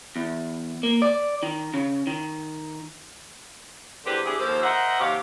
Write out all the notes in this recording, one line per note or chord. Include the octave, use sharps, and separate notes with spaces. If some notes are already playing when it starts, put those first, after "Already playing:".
E2
A#3
D5
D#3
C#3
D#3
E2 D3 C4 G4 B4 C5
D4 E4 G4 G#4
D#2 F3 A#3 A4 C5
A#4 C5 D#5 E5 F#5
D#2 C3 G4 C#5 F5